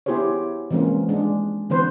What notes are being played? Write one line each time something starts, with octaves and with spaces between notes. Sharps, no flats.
B3 E4 G4 G#4 C5 C#5
E3 F3 G#3 A#3 C4 C#4
G#3 D4
D3 E3 B3 C4 B4 C5